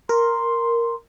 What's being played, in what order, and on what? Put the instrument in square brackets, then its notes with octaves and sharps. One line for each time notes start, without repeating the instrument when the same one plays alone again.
[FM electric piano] A#4 [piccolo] C6